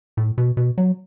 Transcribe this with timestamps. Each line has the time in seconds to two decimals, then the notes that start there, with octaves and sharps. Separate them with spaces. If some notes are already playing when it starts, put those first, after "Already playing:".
0.17 A2
0.38 B2
0.57 B2
0.78 F#3